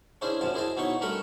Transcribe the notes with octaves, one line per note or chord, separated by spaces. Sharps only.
C#4 D4 E4 G#4 C5
F#2 A#2 F3 A5
E4 G#4 C5 D#5 A5
B2 D#4 E4 C#5 C#6
G2 A3 A#4 E5 B5 C#6